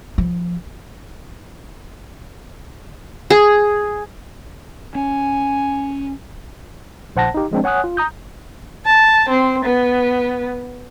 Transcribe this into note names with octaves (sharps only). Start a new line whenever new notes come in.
F3
G#4
C#4 G#5
A#1 C5 F#5 A5 A#6
D#4 G4
F3 G#3 C4 D4
C#5 F#5 G#5 D#6 F#6
F4
A#5 D#6 G6
A5
C4
B3